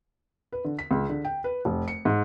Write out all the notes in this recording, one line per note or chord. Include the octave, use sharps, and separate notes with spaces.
B4
D3
B6
C#2
D3
G5
B4
F1
C#7
G#2